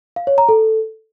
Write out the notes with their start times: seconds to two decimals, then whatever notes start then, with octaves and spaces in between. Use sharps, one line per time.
0.16 F5
0.27 C#5
0.38 A#5
0.49 A4